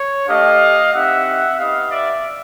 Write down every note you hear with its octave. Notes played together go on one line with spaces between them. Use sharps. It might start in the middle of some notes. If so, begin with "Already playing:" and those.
Already playing: C#5
A3 D4 G4 D#5 F5
C4 D#4 G4 E5 F#5
B3 D#4 G4 D#5 F5
D5 E5